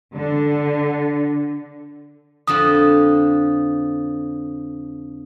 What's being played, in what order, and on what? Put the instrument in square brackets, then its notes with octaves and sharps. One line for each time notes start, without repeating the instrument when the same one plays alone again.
[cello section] D3
[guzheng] F2 D3 F3 [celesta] D#6